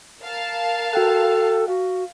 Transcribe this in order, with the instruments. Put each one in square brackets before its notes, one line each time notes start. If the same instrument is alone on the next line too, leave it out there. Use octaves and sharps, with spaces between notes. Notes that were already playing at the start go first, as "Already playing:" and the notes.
[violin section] A#4 F5 A5
[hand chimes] F#4 G5 F#6 [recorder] A4
[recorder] F#4 [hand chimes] F5